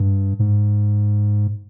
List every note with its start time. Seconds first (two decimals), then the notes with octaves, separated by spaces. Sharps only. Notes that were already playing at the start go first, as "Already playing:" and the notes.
Already playing: G2
0.39 G#2